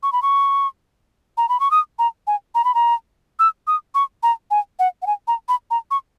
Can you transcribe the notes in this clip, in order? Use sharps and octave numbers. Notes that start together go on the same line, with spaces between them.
C#6
B5
C#6
A#5
B5
C#6
D#6
A#5
G#5
A#5
B5
A#5
E6
D#6
C#6
A#5
G#5
F#5
F#5
G#5
A#5
B5
A#5
C#6